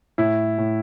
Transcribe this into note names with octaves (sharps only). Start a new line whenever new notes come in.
A2 E4
A2